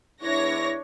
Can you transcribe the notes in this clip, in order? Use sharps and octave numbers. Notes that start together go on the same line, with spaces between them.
E2 D4 E4 C#5 A#6